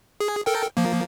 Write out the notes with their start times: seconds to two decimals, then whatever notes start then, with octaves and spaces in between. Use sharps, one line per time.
0.20 G#4
0.46 A4 A#4 G5
0.77 F3 A#3